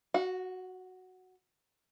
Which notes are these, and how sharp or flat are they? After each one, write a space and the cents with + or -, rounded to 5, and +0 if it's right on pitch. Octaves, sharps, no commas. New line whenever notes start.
F#4 +0 F#5 -40